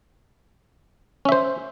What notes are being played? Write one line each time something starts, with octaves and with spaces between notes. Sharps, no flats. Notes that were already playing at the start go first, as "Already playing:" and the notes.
C#4 C5 E5